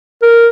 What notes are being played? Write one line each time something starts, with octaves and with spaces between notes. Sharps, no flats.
A#4